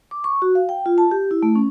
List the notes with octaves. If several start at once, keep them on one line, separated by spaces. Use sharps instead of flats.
D6
C#6
F#4
F5
G5
F4
A5
G4
E4
A3
C#4